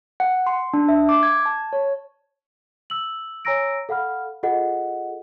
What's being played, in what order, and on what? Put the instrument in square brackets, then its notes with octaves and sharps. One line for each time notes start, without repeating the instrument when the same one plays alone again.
[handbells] F#5
C6
D4
E5
D6
G#6
A5
C#5
[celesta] E6 F#7
C#5 G#5 A#5 E6 A#6 D7
A4 F5 F#5 B5 F6
F4 G#4 A4 D#5 F#5